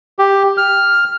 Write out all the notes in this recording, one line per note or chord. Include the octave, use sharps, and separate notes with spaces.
G4
F6